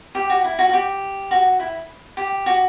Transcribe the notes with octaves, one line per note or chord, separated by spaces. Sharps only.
G4
F#4
E4
F#4
F#4
G4
F#4
E4
G4
F#4